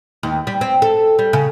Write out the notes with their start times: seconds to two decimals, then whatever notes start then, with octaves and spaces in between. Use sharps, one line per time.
0.23 D#2
0.47 G3
0.61 C4
0.82 A4
1.19 G3
1.33 C#3